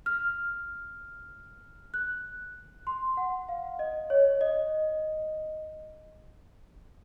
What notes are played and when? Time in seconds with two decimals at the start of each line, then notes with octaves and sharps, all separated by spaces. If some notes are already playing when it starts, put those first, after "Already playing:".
0.06 F6
1.94 F#6
2.87 C6
3.17 F#5
3.49 F5
3.79 D#5
4.10 C#5
4.41 D#5